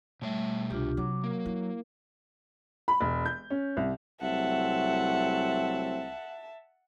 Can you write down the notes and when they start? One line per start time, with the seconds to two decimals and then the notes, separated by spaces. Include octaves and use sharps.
0.22 B2 G3 A3 C#5 E5
0.70 C2 D4 F4 G4
0.97 C3 F#3 D6
1.24 A#3 A#4
1.46 E4
2.88 B5
3.01 E1
3.26 G6
3.50 C#4
3.77 C2
4.22 C2 F#3 A3 C4 E5 F#5 A5